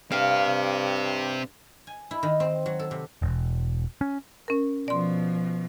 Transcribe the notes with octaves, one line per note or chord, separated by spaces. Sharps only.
G2 C4 G4 F5
G#5
E4
D#3
C4
F#3
A4
C3
E1
C#4
C#4 A#4
B2 F3 D5 C6